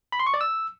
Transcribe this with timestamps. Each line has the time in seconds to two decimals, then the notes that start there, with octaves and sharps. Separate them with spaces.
0.12 B5
0.20 C6
0.27 C#6
0.34 D5
0.41 E6